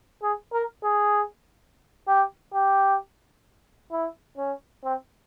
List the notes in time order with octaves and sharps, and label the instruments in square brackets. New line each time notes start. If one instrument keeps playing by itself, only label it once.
[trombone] G#4
A#4
G#4
G4
G4
E4
C#4
C4